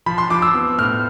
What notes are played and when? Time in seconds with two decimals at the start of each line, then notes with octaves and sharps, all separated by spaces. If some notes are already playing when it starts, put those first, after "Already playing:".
0.06 F3 B5
0.18 C6
0.30 F3 D6
0.42 E6
0.54 B3
0.78 A2 F6